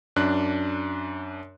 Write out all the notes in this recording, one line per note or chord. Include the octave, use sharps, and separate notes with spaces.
F#2 D4 F#6